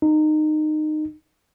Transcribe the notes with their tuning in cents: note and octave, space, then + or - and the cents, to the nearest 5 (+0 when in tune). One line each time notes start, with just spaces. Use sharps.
D#4 -20